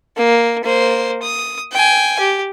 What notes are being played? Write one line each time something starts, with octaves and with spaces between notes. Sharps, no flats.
A#3
A#3 C5
D#6
G5 G#5
G4